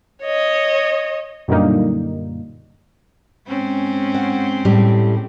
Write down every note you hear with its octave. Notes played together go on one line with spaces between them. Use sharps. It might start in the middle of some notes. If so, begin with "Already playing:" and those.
C#5 D#5
F#2 A#2 D3 G3 A#3 D#4
G#2 C4 C#4
F#5
A2 G3 A3